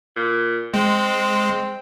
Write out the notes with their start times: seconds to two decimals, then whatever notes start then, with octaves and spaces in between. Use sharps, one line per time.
0.16 A#2
0.74 G#3 C4